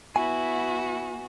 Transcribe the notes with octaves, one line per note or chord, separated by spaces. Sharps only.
B3 E4 F#4 G#5